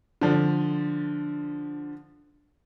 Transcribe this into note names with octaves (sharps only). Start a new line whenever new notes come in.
D3 F3 D4